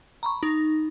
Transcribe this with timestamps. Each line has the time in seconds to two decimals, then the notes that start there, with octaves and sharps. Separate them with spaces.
0.23 A#5 B5 C#6
0.43 D#4